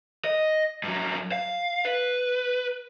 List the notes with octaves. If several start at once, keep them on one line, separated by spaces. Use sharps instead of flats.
D#5
G2 F#3
F5
B4